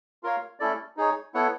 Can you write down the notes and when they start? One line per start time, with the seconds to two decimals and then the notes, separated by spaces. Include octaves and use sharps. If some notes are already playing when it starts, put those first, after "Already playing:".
0.23 F4 A#4 C#5 F5
0.60 A3 C#4 E4 A4 D5
0.97 D#4 G#4 C#5
1.34 B3 E4 A4 C#5 F#5